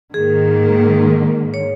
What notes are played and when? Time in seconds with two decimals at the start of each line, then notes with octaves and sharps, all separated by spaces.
0.14 G#2 D#3 A#3 G#4
1.54 C#5